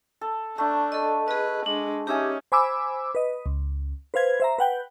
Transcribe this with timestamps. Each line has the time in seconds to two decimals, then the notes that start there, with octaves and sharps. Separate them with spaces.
0.21 A4
0.58 A3 D4
0.92 A4 D#5
1.28 G#4 B4 D#5
1.66 G#3 D4
2.07 C#4 D#4 G4 E5 G#5 D6
2.52 C5 G#5 B5 D6 E6
3.15 B4 D#5
3.46 C#2
4.14 B4 C5 F5 G#6
4.40 C5 E5 A#5
4.58 B4 F#5 G5